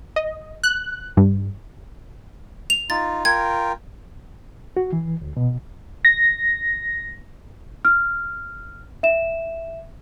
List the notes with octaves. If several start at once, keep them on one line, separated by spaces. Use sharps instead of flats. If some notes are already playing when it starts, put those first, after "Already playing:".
D#5
F#6
G2
F7
D#4 F4 A6
F4 A#4 G5 G#6
F#4
E3
D2
B2
A#6
F6
E5 E7